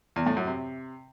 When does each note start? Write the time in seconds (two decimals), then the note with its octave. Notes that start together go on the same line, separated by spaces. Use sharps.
0.16 E2
0.26 A2
0.37 F#2
0.47 C3